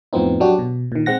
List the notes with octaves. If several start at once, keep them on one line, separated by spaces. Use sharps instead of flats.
F2 A2 F3 B3 C4 D#4
F#3 D4 F#4 G4
B2
A#2 D#3
G#3 C4 F#5 A#6